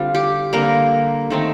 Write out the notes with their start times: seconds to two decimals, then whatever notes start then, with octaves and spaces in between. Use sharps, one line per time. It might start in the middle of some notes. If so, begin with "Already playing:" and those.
Already playing: D3 G3 C4 F4
0.15 G4
0.53 D3 G3 A#3 C4 A#4
1.30 D#3 A3 C4 D#4